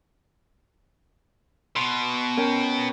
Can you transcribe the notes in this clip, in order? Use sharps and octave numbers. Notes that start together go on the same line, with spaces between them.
B2 C6
C#4 A#4 G5